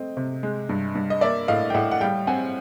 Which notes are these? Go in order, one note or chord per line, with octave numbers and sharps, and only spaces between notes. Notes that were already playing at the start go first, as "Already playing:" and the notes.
Already playing: A3 C4 D#5
C3
G#3
G2
G2
D#5
A#3 D5 E5
A2 D#5 F5
G5
A2 E5 F#5
F#5
G3 F5 G5
C4 F#5 G#5